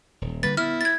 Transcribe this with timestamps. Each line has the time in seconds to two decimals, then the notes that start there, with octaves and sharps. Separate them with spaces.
0.21 D#1
0.43 D3 G3 A#3 B4 A6
0.57 B3 E4 F6
0.81 G#6 A6